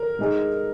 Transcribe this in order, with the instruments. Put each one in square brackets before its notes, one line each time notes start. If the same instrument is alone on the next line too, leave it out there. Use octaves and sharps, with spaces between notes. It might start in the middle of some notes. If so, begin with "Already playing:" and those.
Already playing: [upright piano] A#4
[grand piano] G#3 D#4 G#4